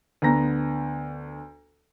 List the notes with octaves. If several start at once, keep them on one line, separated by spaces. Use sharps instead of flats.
D2 B3 A#5 A#6